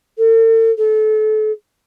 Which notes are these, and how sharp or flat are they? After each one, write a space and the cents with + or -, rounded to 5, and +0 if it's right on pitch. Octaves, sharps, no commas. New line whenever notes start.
A4 +45
A4 -30